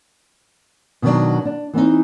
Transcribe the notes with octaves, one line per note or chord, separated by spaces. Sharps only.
B2 D#3 F3 F#3 D4
D4
E3 B3 C4 D#4